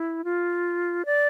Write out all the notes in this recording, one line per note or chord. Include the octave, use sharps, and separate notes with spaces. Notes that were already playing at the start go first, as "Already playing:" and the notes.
Already playing: E4
F4
D5